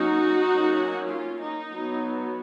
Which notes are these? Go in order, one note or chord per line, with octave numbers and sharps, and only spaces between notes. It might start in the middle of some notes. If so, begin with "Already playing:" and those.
Already playing: F#3 A#3 C#4 D#4 F#4
F#3 A#3 C#4
F4
D#4
F#3 B3